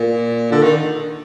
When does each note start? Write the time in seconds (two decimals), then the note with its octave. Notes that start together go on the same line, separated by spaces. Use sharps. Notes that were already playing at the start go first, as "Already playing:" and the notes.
Already playing: A#2
0.52 D3
0.63 D#3